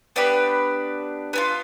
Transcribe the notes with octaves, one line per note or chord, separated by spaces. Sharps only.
B3 D4 G4 B4
B3 D4 F4